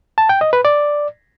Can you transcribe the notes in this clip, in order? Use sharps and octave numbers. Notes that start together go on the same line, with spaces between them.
A5
G5
D#5
B4
D5